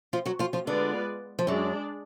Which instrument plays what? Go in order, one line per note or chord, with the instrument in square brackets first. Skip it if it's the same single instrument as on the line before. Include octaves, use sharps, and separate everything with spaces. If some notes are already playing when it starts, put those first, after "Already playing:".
[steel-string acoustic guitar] F3 F4
F#3 F#4
F3 F4
F3 F4
[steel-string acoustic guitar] D3 D4 [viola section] G#3 B3 F4 B4 D5
[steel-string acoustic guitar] F3
[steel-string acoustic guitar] F#2 F#3 [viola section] G#3 D4 G#4 D5